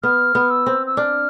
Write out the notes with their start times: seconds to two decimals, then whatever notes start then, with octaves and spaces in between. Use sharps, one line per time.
0.03 B3 F6
0.35 B3
0.50 E6
0.66 C4
0.87 E6
0.97 D4 F6